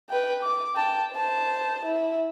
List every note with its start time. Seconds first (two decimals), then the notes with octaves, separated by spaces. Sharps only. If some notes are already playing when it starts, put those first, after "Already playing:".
0.10 B4 G5
0.43 D6
0.75 G5 A5
1.14 C5 A5
1.86 E4